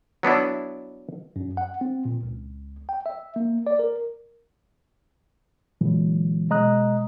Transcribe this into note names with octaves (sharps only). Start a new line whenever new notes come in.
F#3 B3 D4 E4
F#2
F#5
C4
A#2
C#2
G5
E5
A#3
D5
A#4
A#2 D3 E3 F#3 G#3
B2 G#3 D#5 A#5 D#6 F#6